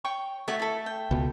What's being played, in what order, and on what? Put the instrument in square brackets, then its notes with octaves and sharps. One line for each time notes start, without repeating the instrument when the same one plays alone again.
[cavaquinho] C#5 G5 C#6
[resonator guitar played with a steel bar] A3 [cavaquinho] F#4 C#5 E5
[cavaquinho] E4 A4
G5
[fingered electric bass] C#2 B2